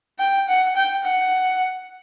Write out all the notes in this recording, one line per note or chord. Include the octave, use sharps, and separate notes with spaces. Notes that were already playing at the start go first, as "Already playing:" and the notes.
G5
F#5
G5
F#5